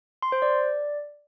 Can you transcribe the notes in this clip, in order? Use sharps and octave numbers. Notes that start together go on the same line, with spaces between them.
C6
C5
D5